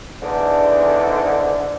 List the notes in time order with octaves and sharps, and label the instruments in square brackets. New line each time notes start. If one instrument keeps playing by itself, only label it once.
[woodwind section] E2 G#2 D3